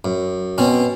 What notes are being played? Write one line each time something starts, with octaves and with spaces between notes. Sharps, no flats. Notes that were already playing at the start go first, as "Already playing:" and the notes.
F#2
B2 C4 C#4